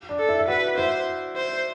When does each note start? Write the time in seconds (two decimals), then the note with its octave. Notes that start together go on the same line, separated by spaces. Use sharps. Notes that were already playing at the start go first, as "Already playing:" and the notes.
0.09 D4
0.19 A4
0.29 E4
0.39 E4
0.48 F#4 B4
0.77 E4 C5
1.36 C5